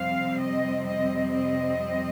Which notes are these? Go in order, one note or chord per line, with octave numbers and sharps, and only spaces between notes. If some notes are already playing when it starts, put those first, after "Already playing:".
Already playing: F2 C3 G3 C4 F5
D#5
D#5
D#5